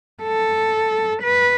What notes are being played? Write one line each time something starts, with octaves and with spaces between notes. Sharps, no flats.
A4
B4